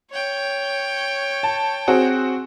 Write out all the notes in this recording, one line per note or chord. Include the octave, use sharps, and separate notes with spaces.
C#5 G5
A5
C4 F#4 G#4